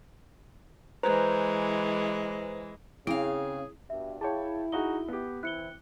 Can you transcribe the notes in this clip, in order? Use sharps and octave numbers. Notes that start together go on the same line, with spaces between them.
E3 G#3 B4 C5 A#5
C#3 C4 E4 G#4 F5
G2 B2 E5
E4 G#4 C#5 F5 G5 A5
D#4 F#4 G#4 G7
B3 G4
E3 C4 E4 F#6 C#7 G7